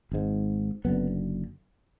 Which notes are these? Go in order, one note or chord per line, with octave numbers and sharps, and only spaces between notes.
G#1 G#2
F#1 F#2 D3 B3